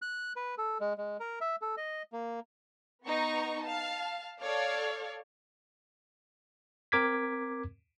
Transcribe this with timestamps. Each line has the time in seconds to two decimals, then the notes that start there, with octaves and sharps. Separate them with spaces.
0.02 F#6
0.36 B4
0.58 A4
0.81 G#3
0.98 G#3
1.20 A#4
1.41 E5
1.62 A4
1.77 D#5
2.12 A#3
3.06 B3 D#4 A#5 C#6
3.62 F5 A5
4.40 A4 C#5 D5 F5
6.92 C4 A#4 D6 G#6 B6